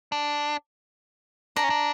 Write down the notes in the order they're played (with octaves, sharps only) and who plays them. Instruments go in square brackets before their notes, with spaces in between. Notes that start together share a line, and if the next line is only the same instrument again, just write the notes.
[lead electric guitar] D4
[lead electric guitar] D4 [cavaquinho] A#5
[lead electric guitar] C#4
D4